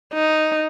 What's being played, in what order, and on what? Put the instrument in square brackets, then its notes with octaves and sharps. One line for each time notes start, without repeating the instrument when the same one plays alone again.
[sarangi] D#4